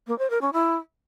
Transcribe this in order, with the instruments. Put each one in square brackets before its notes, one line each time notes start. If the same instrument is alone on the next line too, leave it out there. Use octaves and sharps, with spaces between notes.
[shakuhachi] A#3
C5
A#4
C#4
E4